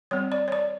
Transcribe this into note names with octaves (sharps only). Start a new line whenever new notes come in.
G3 C4 C#5
D5
C#5
D5